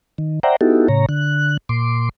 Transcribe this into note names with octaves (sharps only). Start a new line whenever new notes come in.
D#3
C5 D5 E5 F#5 G5 A#5
B3 D#4 E4 F#4 G4 A4
A2 C#3 C#5 A#5
D3 F#6
A#2 C6 D6